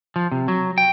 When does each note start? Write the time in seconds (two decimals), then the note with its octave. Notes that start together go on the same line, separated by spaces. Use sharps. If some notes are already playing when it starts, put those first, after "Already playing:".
0.16 F3
0.32 C3
0.48 F#3
0.78 G5